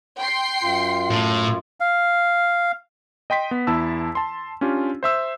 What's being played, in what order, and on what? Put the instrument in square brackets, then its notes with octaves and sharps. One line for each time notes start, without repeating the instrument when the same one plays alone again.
[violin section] G5 C6 C7
[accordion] F#2 F4
[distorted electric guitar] A2
[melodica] F5
[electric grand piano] D#5 G5 C6 B6
B3
E2 E4 A5 E6
A5 C6
C#4 D4 F4 G4
C5 E5 E6